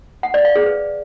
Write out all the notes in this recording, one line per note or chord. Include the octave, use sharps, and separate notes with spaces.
F#5
D5
F5
G#4
B4